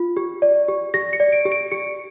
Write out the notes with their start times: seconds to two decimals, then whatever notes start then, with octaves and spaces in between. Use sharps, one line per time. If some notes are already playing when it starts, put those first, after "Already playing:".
Already playing: F4
0.17 G4
0.42 D5
0.68 G4
0.94 G4 A#6
1.13 C#7
1.20 D5
1.33 D7
1.46 G4
1.52 D7
1.71 G4 C#7